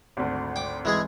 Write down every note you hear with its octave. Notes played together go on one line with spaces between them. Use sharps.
G#1 D2
G5 D6
E3 G#3 G#4